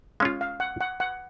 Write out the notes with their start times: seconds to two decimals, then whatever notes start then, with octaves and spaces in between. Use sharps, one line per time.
0.20 G#3 C#4 F4 F5
0.41 F5
0.60 F#5
0.81 F#5
1.00 F#5